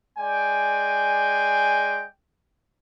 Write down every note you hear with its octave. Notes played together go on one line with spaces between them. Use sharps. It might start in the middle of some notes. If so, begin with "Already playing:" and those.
G#3 D5 G5 G#5